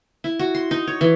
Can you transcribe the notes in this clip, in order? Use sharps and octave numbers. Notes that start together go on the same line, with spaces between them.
E4
F#4
C6
D#4
C#5
E3